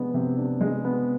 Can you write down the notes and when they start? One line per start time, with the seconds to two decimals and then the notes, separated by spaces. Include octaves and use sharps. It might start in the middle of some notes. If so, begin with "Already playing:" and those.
Already playing: C3 G#3 B3 D4
0.14 C3
0.38 D4
0.61 G#3
0.85 B3